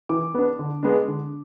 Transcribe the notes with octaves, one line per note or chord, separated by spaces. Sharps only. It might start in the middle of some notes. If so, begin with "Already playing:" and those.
E3 D6
B3 D4
D3
G#3 B3 D4
D3